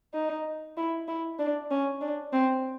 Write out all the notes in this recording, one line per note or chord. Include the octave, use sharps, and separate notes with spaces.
D#4
E4
E4
D4
C#4
D4
C4